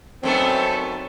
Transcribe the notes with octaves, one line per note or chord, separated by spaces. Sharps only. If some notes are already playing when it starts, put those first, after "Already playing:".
F#2 A3 B3 C4 D#4 A4